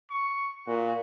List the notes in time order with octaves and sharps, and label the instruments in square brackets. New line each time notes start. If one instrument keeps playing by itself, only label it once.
[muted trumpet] C#6
[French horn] A#2 [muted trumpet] F#4